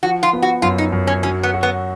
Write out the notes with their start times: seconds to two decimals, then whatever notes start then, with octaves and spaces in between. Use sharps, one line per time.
0.03 F3 F#4
0.23 F4
0.33 B3
0.42 F#4
0.62 F#2 F4
0.78 D#4
0.92 F#2
1.07 C#4
1.23 F#3 C#4
1.43 B3
1.54 F#4
1.63 B3